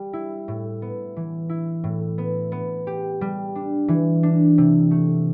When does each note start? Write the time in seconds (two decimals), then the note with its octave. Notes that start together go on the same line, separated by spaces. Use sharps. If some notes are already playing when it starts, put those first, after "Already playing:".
Already playing: G3
0.13 E4
0.48 A2
0.82 B3
1.16 E3
1.49 E4
1.84 A2
2.18 B3
2.52 B3
2.87 G4
3.21 G3
3.55 D4
3.88 E3
4.23 D4
4.58 C3
4.91 A3